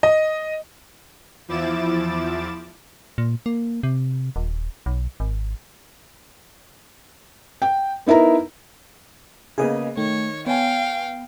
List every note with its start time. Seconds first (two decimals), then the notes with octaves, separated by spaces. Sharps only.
0.03 D#5
1.48 E2 F3 E4 D6 A6 E7
3.18 A#2
3.46 A#3
3.83 C3
4.36 D#1
4.86 B1
5.20 G#1
7.62 G5
8.06 B3 D#4 E4 A#4 A#5
9.58 C#3 A#3 B3 G#4 D#5
9.97 D#3 A3 C#5
10.46 B3 C#5 F5 G5 G#5